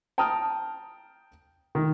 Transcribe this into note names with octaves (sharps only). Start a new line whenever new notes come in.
G5 A5 A#5 D#6 F6
D#3